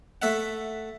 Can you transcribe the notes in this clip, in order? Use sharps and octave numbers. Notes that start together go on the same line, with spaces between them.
A3 E5 F#5